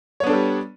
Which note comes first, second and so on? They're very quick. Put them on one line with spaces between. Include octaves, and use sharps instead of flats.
C#5 B3 D4 A4 G3